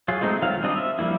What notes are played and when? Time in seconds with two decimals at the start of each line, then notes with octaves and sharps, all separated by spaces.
0.08 F#3 F4 G#4
0.21 G#3 A3 C4 D#4
0.42 D#3 F#3 F4 F5
0.62 G3 C4 D4 D#5
0.76 E5
0.99 F3 G3 A#3 E4